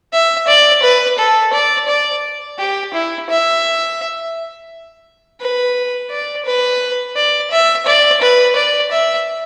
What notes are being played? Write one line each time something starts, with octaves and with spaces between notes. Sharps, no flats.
E5
D5
B4
A4
D5
D5
G4
E4
E5
B4
D5
B4
D5
E5
D5
B4
D5
E5